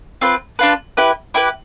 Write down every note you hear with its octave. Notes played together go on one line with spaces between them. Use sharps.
C4 F4 B4
D4 F4 B4
E4 G4 B4
E4 G4 B4